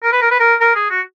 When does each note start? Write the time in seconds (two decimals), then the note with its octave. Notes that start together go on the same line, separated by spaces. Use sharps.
0.03 A#4
0.12 B4
0.22 A#4
0.31 B4
0.40 A#4
0.61 A#4
0.75 G#4
0.90 F#4